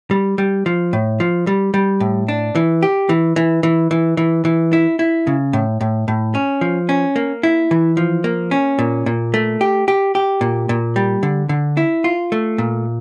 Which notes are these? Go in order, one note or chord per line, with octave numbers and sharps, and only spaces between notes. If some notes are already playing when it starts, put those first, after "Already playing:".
G3
G3
F3
A2
F3
G3
G3
A2
D4
E3
G4
E3
E3
E3
E3
E3
E3
E4
E4
C#3
A2
A2
A2
C#4
F3
C#4
A#3
E4
E3
F3
A#3
C#4
A#2
A#2
A3
G4
G4
G4
A#2
A#2
G3
D3
D3
E4
F4
A3
A#2